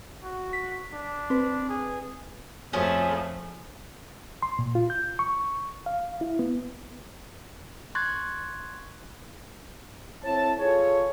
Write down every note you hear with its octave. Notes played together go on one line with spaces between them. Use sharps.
F#4
B6
D4
C4 B4
G#4
F2 F3 A3 C#4 F4 G#4
C6
A#2
F4
G6
C#6
F5
E4
B3
C6 C#6 F#6 G#6 A6
C4 E4 A4 C#5 A5
F4 G#4 A4 C#5